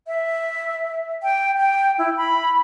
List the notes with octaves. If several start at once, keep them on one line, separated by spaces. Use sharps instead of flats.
E5
G5
G5
E4
B5